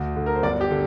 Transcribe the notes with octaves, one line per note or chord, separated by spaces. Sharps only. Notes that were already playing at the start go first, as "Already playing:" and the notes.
Already playing: D2
D3
A#4
C5
G1 D5
G4
D3